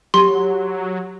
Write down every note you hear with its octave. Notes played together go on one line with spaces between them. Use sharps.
F#3 G4 C6